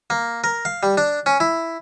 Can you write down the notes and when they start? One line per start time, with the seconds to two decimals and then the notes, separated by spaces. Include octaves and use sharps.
0.10 A#3
0.44 A#4
0.65 F5
0.83 G3
0.97 D4
1.26 C#4
1.40 E4